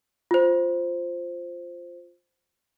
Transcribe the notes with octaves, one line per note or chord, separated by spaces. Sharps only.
F4 C5